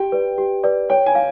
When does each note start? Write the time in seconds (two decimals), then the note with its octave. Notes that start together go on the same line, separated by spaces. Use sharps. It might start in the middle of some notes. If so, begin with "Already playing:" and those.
Already playing: G4 G5
0.12 B4 D5
0.38 G4
0.64 B4 D5
0.90 C#5 G5
1.06 G#5
1.15 F5